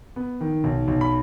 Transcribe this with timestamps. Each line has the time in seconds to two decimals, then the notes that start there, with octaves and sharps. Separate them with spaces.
0.16 B3
0.41 D#3
0.64 B1
0.88 B1
1.01 B5